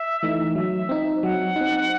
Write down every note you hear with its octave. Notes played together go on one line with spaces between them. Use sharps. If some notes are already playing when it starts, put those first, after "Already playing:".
Already playing: E5
E3 A3 D#4
F#3 E5
C4 D#4
F#3 F#5
C4 D#4